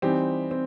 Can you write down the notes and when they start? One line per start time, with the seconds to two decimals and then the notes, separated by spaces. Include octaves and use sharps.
0.02 E3 G3 C4 D#4 G4
0.51 C4